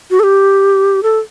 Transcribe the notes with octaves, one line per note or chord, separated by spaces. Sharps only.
F#4
A4
G4
A4